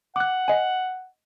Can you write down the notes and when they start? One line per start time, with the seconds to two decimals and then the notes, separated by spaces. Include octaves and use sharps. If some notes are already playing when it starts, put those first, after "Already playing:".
0.16 F#5 D6 F#6
0.48 D#5 G#5